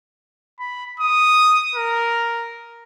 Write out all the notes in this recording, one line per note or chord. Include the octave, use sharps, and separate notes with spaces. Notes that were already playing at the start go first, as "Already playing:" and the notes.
B5
D#6
A#4